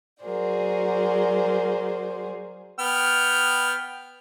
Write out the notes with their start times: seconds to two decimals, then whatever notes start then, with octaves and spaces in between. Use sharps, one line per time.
0.22 F#3 F#4 G#4 A#4 C5 D5
2.79 B3 G5 F6